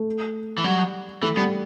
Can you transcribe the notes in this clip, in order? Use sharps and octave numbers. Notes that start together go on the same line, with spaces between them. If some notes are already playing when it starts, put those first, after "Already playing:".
Already playing: A3
E3
F#3 G3
E3 A3
G3 B3